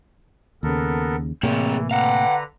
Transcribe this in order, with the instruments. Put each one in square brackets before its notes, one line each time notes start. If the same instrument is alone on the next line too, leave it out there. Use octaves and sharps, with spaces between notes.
[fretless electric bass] D#2 C#3 [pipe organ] B3 A4 A#4
[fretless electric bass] A2 C3 A#3 [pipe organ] E3 [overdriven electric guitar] C4 G#4
[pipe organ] D3 B4 A#5 [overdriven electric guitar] F5 F#5